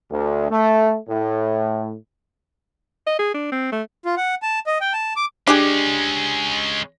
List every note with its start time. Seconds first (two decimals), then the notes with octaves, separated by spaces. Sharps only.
0.10 D2
0.50 A3
1.09 A2
3.07 D#5
3.19 G#4
3.34 D4
3.52 C4
3.72 A3
4.05 F4
4.17 F#5
4.42 A5
4.67 D#5
4.81 G5
4.93 A5
5.16 D6
5.47 G#3 C#4 D4 G4 G#4